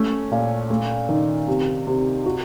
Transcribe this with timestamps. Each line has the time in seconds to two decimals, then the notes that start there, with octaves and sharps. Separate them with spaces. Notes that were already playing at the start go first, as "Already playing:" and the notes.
Already playing: A3 C#4
0.31 A#2
0.70 A3
1.09 D#3
1.48 C3
1.87 C3
2.26 F#4